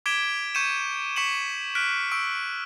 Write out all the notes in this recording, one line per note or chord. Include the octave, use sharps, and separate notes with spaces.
D6 G#6 B6 D7 E7 G7
C#6 G6 G#6 C#7 D#7 E7
C#6 B6 C#7 E7 F#7
F6 F#6 B6 D7
C#6 E6 D7